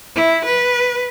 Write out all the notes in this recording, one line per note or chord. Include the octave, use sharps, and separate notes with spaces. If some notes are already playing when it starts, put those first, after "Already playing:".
E4
B4